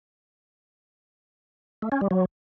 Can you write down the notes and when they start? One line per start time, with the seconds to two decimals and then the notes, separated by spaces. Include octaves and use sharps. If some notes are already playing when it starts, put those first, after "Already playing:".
1.82 A3
1.92 C#4
2.01 G3
2.11 F#3